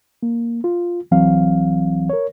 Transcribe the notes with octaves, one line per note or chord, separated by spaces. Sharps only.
A#3
F4
C2 E3 F#3 C4 F5
A#4 C#5